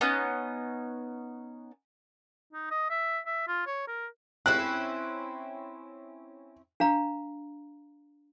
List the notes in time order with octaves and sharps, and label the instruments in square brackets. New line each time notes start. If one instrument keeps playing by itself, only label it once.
[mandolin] B3 C#4 D#4 C#5
[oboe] D#4
D#5
E5
E5
F4
C#5
A#4
[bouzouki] C4 C#4 E4 [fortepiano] F#6
[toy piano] D4 F5 A#5